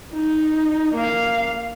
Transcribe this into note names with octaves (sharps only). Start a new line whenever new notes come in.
D#4
A#3 F5